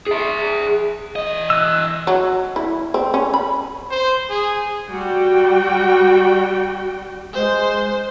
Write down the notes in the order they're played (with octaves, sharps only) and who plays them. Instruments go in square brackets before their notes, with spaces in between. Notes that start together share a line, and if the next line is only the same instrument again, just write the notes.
[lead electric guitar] G#4 E5
E3 D#5
[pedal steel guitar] E6 F#6
[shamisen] F#3
E4
C4
C#4
B5
[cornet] C5
G#4
[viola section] G3 F#4 G5
[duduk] G#3 [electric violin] C5